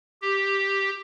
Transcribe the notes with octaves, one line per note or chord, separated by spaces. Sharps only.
G4